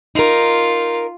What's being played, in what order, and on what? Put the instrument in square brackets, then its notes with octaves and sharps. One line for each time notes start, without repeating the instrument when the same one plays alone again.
[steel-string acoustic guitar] D#4 A#4 [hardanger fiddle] F4